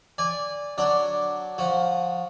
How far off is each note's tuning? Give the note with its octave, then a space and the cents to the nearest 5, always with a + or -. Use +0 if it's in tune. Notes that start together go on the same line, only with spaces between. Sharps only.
D5 -10 G#5 -20
F#3 +0 D4 +0 D5 +0
F3 +15 F#4 +0